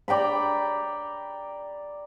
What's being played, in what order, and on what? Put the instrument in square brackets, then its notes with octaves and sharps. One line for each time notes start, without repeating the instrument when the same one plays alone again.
[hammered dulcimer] D5 G5 A#5 B5